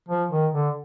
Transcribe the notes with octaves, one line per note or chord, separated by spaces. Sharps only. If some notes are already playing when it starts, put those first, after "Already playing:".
F3
D#3
D3